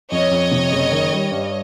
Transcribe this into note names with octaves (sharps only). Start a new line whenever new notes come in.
F2 C#5 D#5
F2
C3
F#1
D#3
G3
G2